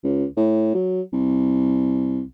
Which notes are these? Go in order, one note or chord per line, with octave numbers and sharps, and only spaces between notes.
C#2
A2
F#3
C2